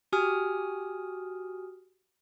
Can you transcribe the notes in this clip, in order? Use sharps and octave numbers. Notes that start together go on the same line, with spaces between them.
F#4 G4 G#5 D#6 F6